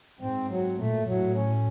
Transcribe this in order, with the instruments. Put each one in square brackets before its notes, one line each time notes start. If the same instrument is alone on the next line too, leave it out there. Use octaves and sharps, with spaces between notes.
[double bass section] G#2 [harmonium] C4
[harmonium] F#3
[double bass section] A#2 [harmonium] A3
[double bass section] A2 [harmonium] F#3
[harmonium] C#4